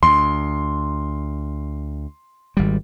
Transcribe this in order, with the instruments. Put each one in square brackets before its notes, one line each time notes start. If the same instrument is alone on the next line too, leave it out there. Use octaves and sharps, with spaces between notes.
[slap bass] D2 [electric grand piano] C6
[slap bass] G#1 G3